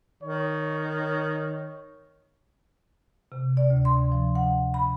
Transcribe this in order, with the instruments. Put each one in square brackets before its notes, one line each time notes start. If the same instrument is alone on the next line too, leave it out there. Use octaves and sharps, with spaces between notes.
[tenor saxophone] D#3 [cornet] C#5
[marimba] C3
D5
D2
C6
F3
F#5
B5